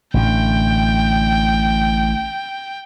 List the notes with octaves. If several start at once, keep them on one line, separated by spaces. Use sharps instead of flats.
A1 D3 G5